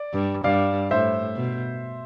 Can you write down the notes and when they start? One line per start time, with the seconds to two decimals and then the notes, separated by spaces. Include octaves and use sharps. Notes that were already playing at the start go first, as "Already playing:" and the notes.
Already playing: D5
0.14 G2
0.44 G2 D5 F5
0.90 A2 C5 E5
1.36 B2